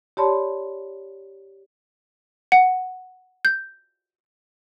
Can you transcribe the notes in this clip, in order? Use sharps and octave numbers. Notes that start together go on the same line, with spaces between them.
G4 C#5 D5 A5 B5 C6
F#5
G6